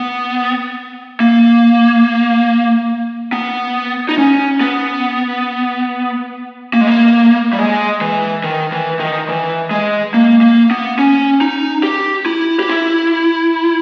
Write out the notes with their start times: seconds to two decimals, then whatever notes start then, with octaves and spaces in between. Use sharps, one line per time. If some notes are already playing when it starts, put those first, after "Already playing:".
Already playing: B3
1.20 A#3
3.32 B3
4.09 D#4
4.18 C#4
4.61 B3
6.73 A#3
6.81 G#3
6.87 A#3
7.53 G3
7.59 G#3
8.01 E3
8.44 D#3
8.72 E3
9.00 D#3
9.29 E3
9.71 G#3
10.14 A#3
10.41 A#3
10.71 B3
10.99 C#4
11.41 D#4
11.83 G4
12.26 E4
12.59 G4
12.69 E4